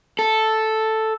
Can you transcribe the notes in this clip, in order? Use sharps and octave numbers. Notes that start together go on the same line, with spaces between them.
A4